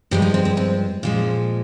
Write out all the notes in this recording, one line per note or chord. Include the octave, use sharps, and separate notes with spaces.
G2 F3 G#3 G4
D#4
C4
C4
C4
A#2 F3 G#3 C#4